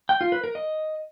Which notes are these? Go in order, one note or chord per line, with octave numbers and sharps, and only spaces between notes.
G5
F4
B4
A#4
D#5